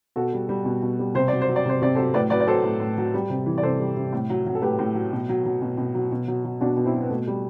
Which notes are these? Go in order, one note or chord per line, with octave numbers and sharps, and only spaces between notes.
B2 F#4 A4
G3
G3
B2
B2
G3
C3 C5
F#3 D5
C5
F#3
D5
C3 C5
C3 D5
F#3 A4 C5
A2 B4 D5
F#3 B4 D5
D5
F#3 A4 C5
A2
A2
F#3
G3
C3
E3
D5
C3 A4 C5
G3
C3
A2
F#3
F#3
A4
A2 G4 B4
A2
F#3
B2
F#3
F#3
B2
B2
F#3
B2
F#3
F#3
B2 D4 F#4
B2
C4 E4
F#3
B3
B2 A3
G3